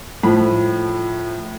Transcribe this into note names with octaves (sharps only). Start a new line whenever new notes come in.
A2 F3 B5